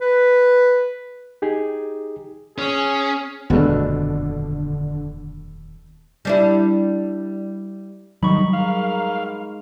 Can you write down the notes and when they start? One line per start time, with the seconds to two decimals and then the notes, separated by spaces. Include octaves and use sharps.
0.02 B4
1.42 D#4 G4 G#4
2.58 C#4 G#4
3.50 D#1 F2 B2 D3 A3 D4
6.25 G3 D4 E4
8.23 D#3 F#3 G3 B5 C#6
8.53 G#2 A#4 F5